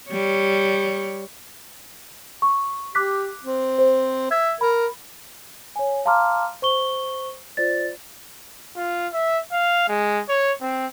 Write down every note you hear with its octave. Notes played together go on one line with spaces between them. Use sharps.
G3 C#5
C#6
G4 D6 F#6 B6
C4
C5
E5 G#6
A#4 B5
C#5 G#5
F5 A5 A#5 C6 D6 F6
C5 C#6 G7
F4 C5 D5 A6
F4
E5
F5
G#3
C#5
C4